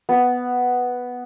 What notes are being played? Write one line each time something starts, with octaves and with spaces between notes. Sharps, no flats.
B3